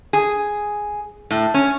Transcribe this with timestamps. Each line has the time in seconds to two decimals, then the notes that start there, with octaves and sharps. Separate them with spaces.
0.13 G#4
1.31 A2
1.54 C#4